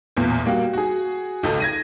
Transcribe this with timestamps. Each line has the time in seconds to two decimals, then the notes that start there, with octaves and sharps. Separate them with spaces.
0.17 A1 E2 A#2
0.45 G3 A#3 F#4
0.73 F#4 G#4
1.43 G#1 C#2 G#2 D#4 A4
1.60 G#6 A#6 D#7